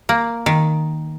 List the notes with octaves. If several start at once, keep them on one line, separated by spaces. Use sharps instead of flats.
A#3
D#3